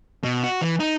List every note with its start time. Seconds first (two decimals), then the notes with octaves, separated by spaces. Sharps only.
0.24 B2
0.44 F#4
0.62 E3
0.80 D#4